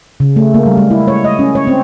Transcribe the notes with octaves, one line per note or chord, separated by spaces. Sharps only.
C#3
A3
A#3
G3
G#3
E4
C#5
D#5
C#4
C#5
C4